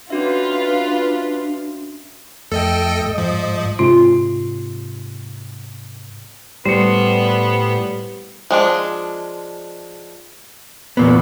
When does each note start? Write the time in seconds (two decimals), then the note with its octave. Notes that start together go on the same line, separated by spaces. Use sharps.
0.10 C#4 D4 F4 F#4 B4 E5
2.52 F2 A3 A4 D#5 E5 G5
3.06 G#2 D#5
3.18 F3
3.79 G#2 C3 F4 C6
6.65 A2 G3 B3 C5 C#7
8.51 F3 G#3 D4
10.97 E2 A#2 B3